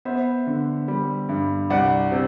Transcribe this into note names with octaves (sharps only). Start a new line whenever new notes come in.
B3 C5 E5
D3
G3
G2
C2 D5 F#5
C3